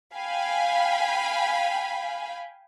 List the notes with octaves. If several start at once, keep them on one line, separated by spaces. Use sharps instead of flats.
F5 G5 G#5 B5